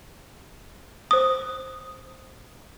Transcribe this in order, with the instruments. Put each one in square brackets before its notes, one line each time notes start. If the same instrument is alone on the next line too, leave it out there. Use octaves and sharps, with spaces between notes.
[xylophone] C5 D#6